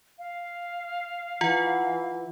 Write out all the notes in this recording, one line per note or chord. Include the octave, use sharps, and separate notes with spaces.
F5
E3 F4 F#5